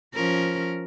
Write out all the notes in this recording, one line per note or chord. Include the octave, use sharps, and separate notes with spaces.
F3 C#4 A#4